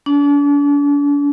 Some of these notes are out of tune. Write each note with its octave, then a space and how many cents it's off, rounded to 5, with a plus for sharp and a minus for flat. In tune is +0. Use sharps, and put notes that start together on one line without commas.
D4 -40